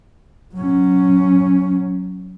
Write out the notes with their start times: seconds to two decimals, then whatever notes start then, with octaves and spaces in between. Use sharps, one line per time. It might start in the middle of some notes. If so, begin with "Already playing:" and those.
0.55 F#3 C#4